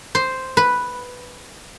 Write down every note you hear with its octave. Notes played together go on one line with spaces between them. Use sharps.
C5
B4